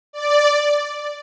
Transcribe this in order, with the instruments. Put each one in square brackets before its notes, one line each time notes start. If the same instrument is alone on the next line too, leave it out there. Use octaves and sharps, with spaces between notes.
[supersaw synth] D5